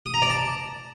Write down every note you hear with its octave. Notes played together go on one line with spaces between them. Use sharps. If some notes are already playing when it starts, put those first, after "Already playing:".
D#6
A#5
D5
A5